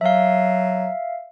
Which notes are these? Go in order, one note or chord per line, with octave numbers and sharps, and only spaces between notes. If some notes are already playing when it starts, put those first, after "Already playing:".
F#3 E5 F5